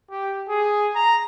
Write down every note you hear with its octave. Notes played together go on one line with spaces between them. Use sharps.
G4
G#4
A#5